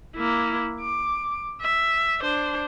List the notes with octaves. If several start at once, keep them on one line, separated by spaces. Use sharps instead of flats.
A#3 E4
D6
E5
D4 C5